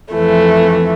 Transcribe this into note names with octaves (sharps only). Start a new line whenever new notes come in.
F2 E3 A3